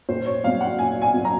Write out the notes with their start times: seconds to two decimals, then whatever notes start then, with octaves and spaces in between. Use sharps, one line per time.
0.09 A#2 C5
0.26 C#5
0.44 F#3 C4 F5
0.61 F#5
0.79 A#2 G#5
1.02 G#5
1.14 F#3 C4
1.25 A#5